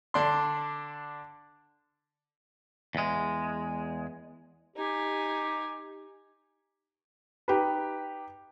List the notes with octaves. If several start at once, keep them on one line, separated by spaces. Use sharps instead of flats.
D3 D4 C6
E2 G#3
D#4 G4 G#5
D#4 G4 B4